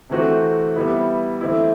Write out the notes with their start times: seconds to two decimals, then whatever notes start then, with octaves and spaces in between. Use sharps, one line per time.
0.10 C3 E3 A3 C4 F#4
0.76 G3 B3 E4 B4
1.41 E3 A3 C4 E4